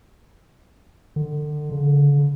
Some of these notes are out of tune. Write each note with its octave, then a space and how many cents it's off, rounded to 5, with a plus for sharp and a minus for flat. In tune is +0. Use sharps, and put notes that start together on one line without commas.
D3 +30
D3 -45